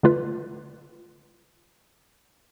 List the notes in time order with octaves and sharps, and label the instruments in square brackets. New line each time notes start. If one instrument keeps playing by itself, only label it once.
[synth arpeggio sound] D3 A3 F4 B4